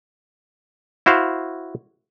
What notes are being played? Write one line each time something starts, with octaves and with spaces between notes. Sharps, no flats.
E4 F#4 C5 F5